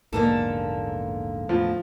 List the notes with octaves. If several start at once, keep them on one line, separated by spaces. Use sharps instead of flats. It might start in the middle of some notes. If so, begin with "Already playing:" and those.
A#1 E2 G#2 D3 A#3 A4
E2 A2 F3